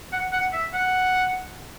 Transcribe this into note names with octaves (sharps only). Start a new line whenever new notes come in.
F#5
F#5
E5
F#5